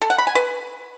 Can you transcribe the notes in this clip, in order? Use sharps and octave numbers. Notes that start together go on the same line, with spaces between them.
A4
F#5
B5
G#5
B4